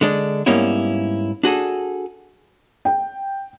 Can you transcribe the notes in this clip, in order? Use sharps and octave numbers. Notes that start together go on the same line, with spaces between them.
D3 G#3 D4
G#2 G3 A#3 B3 C#4 E4
D4 F#4 G#4 A4
G5